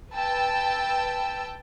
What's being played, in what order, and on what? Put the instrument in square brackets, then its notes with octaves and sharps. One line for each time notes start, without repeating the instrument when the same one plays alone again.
[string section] B4 G5 A5 E6